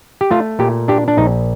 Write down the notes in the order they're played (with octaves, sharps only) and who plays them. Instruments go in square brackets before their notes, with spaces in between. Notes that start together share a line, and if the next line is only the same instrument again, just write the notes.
[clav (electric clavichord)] G4
A3 F4
A#2 G4
D4 G4
D4
A#1 D#4